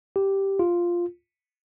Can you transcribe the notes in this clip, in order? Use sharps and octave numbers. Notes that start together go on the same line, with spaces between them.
G4
F4